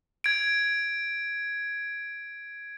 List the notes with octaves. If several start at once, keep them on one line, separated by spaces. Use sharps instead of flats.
G#6 D7